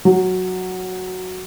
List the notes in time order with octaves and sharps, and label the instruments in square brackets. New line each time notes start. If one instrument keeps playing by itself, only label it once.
[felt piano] F#3